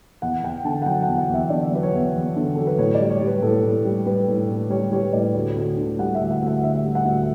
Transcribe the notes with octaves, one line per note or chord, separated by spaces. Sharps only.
E2 F#5
E2 G5
D3 A5
F#5
F#3 G5
F#5
E2
F#5
E2 E5
D3 D5
F#3 B4
C#5
E2
E2
D3
F#3 A4
B4
A2 C#5
D5
G3
C#5
G3
B4
A2 A4
A2
G3
G3 B4
A2
A2
G3 C#5
G3 C#5
A2 D5
D2
D2
D3
G3 F#5
E5
D2
F#5
D2 F#5
D3 E5
G3
F#5
D2